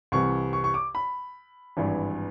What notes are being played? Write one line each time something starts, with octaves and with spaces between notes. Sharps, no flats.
C2 C3 E3 C#6
C#6
C#6
D6
B5
G#1 G2 E3